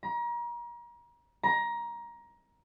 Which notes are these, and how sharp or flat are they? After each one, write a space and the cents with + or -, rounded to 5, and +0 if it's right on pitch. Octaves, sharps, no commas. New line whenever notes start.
A#5 +35
A#5 +20